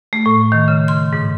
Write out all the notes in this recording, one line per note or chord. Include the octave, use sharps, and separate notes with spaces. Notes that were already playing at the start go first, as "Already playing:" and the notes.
A3
A2
D#3
C#3
C6
G#2